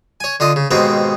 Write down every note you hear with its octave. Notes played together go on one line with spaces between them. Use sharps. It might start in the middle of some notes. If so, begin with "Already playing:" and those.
C#5 G#5
D3 F4 D#5
C#3
D#2 G#2 B2 C4 D#4 G5